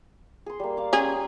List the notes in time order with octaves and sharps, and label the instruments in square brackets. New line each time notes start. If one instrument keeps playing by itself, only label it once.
[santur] G#4 C6
G3 A#3
D5 F5 D6
[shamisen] C#4 G#4 [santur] G4 C#5 C6